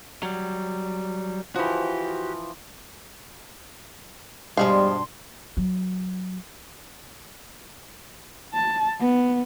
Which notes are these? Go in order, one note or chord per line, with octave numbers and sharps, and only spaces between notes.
F#3 G3
E3 F3 F#4 G4
G2 B2 F3 G3 G#3 D4 F5 C6
F#3
A5
B3